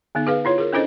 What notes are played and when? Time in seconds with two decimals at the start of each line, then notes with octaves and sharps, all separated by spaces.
0.15 D3 B3 D#4
0.27 G#4 B4 F5
0.45 E4 F4 C#5
0.58 G#4 A#4
0.72 C#4 D4 E4 A4 C5 D#5